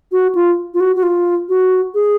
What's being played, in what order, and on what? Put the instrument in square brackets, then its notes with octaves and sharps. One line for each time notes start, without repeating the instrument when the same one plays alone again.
[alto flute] F#4
F4
F4
F#4
F#4
F4
F#4
G#4